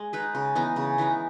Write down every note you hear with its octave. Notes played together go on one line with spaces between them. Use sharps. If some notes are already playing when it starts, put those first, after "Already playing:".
Already playing: G#3
D#4 G#4 B4
C#3
E3 B3 D#4
C#3
E3 B3 D#4